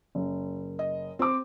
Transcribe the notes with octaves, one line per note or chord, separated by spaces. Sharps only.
F#1
D#5
C4 C5 D6